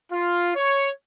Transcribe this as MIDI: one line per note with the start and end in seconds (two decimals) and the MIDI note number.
0.12 0.52 65
0.55 0.90 73